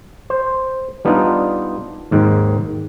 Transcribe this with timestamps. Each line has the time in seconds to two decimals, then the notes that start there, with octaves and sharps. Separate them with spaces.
0.30 C5
1.05 G3 B3 D4 D#4 F4
2.11 D#2 G#2 D#3